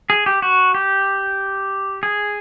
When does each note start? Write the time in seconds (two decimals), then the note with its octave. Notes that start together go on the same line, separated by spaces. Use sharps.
0.10 G#4
0.26 G4
0.42 F#4
0.74 G4
2.03 G#4